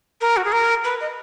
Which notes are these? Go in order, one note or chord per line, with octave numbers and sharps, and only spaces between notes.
A#4
F#4
G#4
A#4
B4
D#5